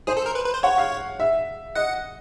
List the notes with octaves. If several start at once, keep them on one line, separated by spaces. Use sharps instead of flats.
G#4 C5
A4
A#4
B4
B4
C5
C#5 F#5
F5
E5
D#5 F#5